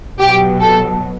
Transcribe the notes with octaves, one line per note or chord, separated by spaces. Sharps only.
B2 F#3 G4
A4